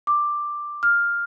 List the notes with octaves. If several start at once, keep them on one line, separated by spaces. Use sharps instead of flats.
D6
F6